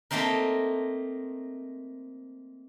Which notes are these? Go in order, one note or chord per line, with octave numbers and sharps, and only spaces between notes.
A3 A#3 C4 D#4 A#4